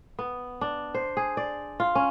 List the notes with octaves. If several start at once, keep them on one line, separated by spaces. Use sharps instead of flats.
B3
D4
C5
G#4
D5
F4
C#4